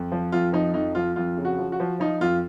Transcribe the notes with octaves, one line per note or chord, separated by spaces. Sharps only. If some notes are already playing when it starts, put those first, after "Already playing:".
Already playing: F2
F3
F2 F4
F3 D#4
F2 D#4
F3 F4
F2 F4
C#3
F#4
F3
F#4
F3
F3 D#4
F2 F4